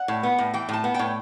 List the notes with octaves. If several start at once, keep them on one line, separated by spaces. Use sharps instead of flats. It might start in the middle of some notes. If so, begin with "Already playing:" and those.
Already playing: F#5
A2
B3
A2
E3 G5
A2 A5
B3
A2 G5